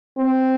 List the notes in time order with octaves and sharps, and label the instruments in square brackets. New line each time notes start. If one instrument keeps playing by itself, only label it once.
[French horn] C4